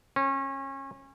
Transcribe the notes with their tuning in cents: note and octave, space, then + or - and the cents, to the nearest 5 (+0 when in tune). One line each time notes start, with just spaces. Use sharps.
C#4 -30